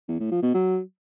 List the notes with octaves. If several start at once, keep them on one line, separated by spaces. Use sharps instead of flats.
E2
A2
F3
B2
F#3